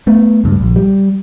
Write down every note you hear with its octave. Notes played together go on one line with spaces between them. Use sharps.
A3 B3
C#2 G2
A#1
G3